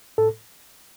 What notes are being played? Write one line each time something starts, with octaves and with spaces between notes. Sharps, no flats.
A2 A4